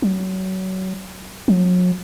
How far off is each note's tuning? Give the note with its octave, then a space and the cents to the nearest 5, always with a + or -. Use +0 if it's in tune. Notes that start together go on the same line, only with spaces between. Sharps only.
F#3 +25
F#3 -40